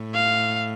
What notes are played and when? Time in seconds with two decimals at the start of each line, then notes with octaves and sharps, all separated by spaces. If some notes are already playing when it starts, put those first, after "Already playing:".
Already playing: A2
0.14 F5